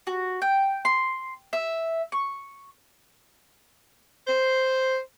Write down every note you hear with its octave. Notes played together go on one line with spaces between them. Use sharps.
F#4
G5
C6
E5
C#6
C5